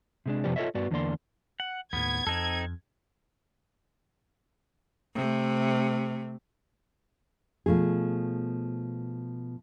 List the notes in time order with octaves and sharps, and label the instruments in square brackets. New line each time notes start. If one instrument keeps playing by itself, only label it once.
[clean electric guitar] C3 G#3 D4
F2 C3 F3 B3 G4 D5
F4 A4 B4 C#5 D#5 E5
G2 B3 F#4 D5
E2 D3 A#3 D5 C6
[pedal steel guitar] F#5
[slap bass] D#2 A2 [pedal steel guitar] B3 [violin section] G#6
[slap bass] F2 [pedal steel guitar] C4 D#4 A4
[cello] C3 A3
[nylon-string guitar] B2 F3 A3 G#4